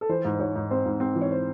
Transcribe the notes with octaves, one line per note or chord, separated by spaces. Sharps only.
A4
E3 C5
G#2
C5
G#2 C#5
G#2
C4 C5
G#2
C4
E3
C#5
C5